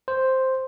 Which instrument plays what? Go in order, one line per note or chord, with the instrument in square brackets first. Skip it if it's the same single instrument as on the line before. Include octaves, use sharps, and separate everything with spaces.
[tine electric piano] C5